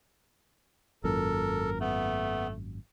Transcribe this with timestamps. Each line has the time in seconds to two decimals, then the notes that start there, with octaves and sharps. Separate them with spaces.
1.04 G#1 F#2 A#2 A4 A#4
1.80 A3 B3